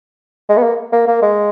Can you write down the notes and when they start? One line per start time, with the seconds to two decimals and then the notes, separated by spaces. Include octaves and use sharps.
0.49 G#3
0.57 B3
0.63 A#3
0.93 A#3
1.08 A#3
1.22 G#3